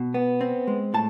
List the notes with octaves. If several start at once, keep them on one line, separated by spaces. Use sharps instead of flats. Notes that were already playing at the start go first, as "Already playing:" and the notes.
Already playing: B2
B3
C4
G#3
A2 A5